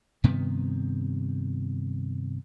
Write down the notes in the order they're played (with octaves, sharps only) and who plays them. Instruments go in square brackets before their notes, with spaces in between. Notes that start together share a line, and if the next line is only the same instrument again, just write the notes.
[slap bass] G2 C3 D#3 B3